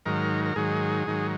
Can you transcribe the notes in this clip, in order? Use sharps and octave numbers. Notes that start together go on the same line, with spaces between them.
G#2 D#3 F#3 A#4
A#4
G#2 D#3 F#3 G#4
G#2 D#3 F#3